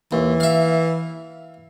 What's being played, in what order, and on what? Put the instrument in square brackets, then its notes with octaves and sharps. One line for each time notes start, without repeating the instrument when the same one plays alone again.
[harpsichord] D#2 [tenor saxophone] E3
[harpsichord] E5 F5